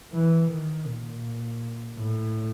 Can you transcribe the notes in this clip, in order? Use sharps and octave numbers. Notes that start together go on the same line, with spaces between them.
E3
D#3
A#2
A2